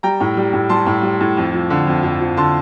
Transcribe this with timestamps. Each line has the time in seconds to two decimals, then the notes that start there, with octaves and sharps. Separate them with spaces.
0.03 G3 G5 A#5
0.20 A2
0.37 G3
0.53 A2
0.69 G3 A5 C6
0.86 A2
1.03 G3
1.21 A2
1.37 F2
1.54 F3
1.70 D3
1.87 F2
2.03 F2
2.20 F3
2.37 D3 A5 C6